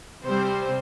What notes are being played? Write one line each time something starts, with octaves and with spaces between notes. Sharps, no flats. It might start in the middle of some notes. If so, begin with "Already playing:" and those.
C3 G3 C4 C5